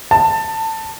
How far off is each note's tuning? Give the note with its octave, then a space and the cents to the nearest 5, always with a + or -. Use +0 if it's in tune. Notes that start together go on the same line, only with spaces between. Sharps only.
A5 +20